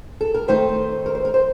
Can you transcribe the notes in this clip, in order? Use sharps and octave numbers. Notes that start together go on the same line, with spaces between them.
A4
A#4
D#3 A3 C4 D#4 C5
A#4
C5
A#4
C5